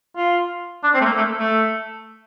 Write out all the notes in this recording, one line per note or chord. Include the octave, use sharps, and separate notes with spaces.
F4
D4
C4
A3
A#3
A3
A3